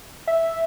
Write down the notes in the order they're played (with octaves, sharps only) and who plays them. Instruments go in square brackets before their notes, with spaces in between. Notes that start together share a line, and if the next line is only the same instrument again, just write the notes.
[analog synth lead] E5